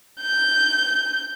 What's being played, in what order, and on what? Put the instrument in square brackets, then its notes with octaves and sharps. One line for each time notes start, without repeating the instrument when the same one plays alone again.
[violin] G6